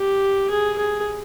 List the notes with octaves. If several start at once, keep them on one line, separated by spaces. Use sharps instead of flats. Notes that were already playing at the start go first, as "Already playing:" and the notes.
Already playing: G4
G#4
G#4